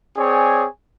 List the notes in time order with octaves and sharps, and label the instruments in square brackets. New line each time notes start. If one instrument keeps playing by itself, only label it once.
[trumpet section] C4 G#4 C#5 D5 G#5